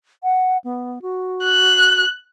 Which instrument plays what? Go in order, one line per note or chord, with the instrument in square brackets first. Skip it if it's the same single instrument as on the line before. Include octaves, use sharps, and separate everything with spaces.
[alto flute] F#5
B3
F#4
[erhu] F#6